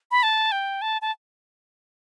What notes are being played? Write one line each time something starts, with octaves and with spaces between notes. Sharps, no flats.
B5
A5
G5
A5
A5